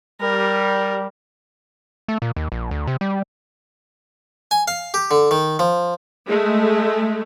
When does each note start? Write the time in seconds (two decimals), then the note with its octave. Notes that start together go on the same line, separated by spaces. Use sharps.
0.20 G3 A#4
2.08 A3
2.22 A#2
2.36 D#2
2.52 A#1
2.71 D2
2.87 C3
3.01 G3
4.51 G#5
4.68 F5
4.94 G4
5.11 D3
5.31 D#3
5.59 F3
6.26 G#3 A3